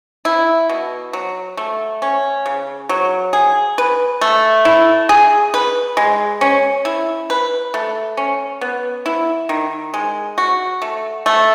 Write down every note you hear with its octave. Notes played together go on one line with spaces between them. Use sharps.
E4
B2
F#3
A3
C#4
C#3
F#3
G#4
B4
A3
E4
G#4
B4
G#3
C#4
E4
B4
A3
C#4
B3
E4
D#3
G#3
F#4
A3
A3